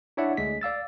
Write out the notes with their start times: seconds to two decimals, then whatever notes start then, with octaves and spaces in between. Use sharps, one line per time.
0.17 D4 E4 C#5 D5 E5 F#5
0.37 D2 G#3 B6
0.61 D5 F5 E6 A6